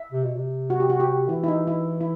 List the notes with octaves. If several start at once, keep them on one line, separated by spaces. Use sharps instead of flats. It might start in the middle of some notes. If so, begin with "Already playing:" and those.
Already playing: E5
C3
B2
C3
F#4
G4
F#4
G4
E3 E4
E4
D#4
E4
E4